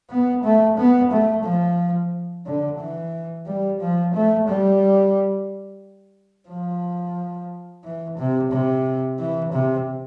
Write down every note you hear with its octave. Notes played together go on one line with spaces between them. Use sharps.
B3
A3
B3
A3
F3
D3
E3
G3
F3
A3
G3
F3
E3
C3
C3
E3
C3